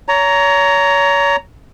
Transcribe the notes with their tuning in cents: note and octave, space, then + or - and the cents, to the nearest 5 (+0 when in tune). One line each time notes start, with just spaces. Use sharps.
C#5 +30 A#5 +0